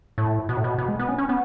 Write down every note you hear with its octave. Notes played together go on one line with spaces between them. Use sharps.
A2
B2
A2
B2
B2
G#3
B3
C#4
C#4
B3